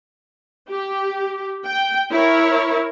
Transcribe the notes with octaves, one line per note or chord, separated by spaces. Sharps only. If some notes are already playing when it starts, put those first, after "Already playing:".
G4
G5
E4 A#4 C#5